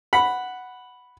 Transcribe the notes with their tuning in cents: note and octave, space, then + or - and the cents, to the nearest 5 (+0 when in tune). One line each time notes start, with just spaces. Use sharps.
F#5 +0 B5 +0